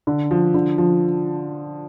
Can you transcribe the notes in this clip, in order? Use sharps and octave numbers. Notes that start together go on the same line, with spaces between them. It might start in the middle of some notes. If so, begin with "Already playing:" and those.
D3
F3
D3
F3